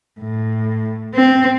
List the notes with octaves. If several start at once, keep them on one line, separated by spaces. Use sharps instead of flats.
A2
C4